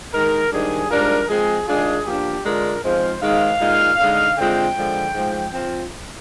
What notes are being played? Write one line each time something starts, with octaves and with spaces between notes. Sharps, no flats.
D#3 G#3 D#4 A#4
G#2 D#3 G3 D4 G#4
G#2 G3 D4 F4 A#4
F3 G#3 C4 G#4
D#3 G#3 D4 F4 G#4
F3 A#3 D4 G4
D3 G#3 D4 F4 A#4
G#2 F3 G#3 C4 F4 C5
G#2 D#3 G#3 D#4 F5
A#2 G#3 D#4
D3 G#3 D#4
D3 G#3 C4 F4 G5
D3 F3 G#3
G#2 F3 G#3
F3 C4 F4